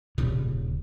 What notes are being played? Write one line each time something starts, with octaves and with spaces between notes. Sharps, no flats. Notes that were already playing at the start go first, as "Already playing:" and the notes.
D#1 C#3